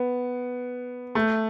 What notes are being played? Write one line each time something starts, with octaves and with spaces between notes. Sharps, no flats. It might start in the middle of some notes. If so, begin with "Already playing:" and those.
Already playing: B3
A3